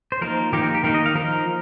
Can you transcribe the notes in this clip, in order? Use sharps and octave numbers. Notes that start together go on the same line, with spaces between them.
C5
F3 A#3 D#4 A#4
D#3 A#3 D#4 G4
A#4
G4
D#3 A#3 D#4 A#4
D#5
F5
F3 D#4 A#4